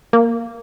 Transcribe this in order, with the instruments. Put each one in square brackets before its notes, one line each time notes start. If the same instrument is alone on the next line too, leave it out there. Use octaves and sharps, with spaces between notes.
[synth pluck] A#3